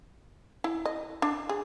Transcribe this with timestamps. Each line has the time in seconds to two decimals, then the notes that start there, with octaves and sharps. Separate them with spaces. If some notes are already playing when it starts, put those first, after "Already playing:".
0.64 E4
0.86 D#5
1.22 D4
1.49 G#4